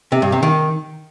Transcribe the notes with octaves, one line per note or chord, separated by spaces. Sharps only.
C3
G2
C3
D#3